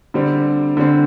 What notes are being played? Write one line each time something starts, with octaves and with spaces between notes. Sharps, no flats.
D3 G3 C4
D3 G3 C4